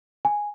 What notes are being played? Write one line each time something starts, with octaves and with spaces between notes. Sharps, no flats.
G#5